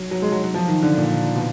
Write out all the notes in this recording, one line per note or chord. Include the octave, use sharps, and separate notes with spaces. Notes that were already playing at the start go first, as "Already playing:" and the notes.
Already playing: F#3
F#3
G#3
F#3
F#3
F3
D#3
D3
A#2
B2